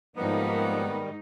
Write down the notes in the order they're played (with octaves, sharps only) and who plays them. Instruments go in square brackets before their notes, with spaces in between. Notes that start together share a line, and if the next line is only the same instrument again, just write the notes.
[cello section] G#2 D#4 [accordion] D#3 G3 [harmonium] F3 [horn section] A#3 B3